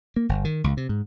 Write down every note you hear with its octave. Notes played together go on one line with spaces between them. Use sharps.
A#3
G1
D#3
C#2
C3
G#2